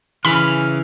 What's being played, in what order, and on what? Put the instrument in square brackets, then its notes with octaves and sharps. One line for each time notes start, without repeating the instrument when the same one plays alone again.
[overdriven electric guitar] C#3 G#4 [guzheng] E3 [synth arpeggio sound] B5 [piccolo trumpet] F6